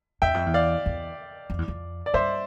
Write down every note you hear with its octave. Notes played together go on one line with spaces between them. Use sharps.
E2 E5 G5
F2
E2
D5 F5
E2
F2
E2
F2
D5
G2 C5 E5